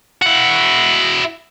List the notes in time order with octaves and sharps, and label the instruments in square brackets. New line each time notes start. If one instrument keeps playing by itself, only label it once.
[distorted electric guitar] E4 F#4